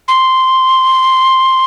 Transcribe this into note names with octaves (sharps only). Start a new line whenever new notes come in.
C6